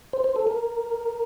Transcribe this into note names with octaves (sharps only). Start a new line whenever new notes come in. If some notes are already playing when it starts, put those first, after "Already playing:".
C5
C5
A4
A#4